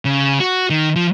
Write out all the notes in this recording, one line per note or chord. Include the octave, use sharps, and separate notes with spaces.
C#3
F#4
D#3
F3